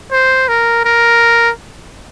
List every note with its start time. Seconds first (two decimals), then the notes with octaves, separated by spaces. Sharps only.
0.12 C5
0.48 A#4
0.85 A#4